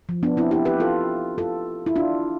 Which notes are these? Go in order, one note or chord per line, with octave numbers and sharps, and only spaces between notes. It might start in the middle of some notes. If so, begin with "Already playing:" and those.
F3
B3 D4
C4 E4
E4 G4
G4 B4
F4 A4
F4 A4
E4
D4 F4